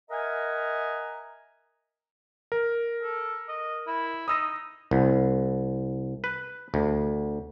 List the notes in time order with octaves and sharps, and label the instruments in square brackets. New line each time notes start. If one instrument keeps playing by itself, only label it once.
[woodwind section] A#4 D#5 E5 F#5 G#5 A#5
[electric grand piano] A#4
[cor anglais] A4
D#5
E4
[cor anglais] D#4 [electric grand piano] D#6 E6 A#6
[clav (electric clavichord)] C2
B4
D2